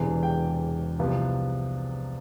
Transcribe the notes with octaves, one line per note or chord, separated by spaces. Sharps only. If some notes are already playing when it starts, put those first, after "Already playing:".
Already playing: E1 E2 C3 E3
G5
C2 C3 F3 B3